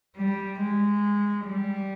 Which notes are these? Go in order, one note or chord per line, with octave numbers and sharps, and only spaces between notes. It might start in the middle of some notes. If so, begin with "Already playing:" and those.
G3
G#3
G3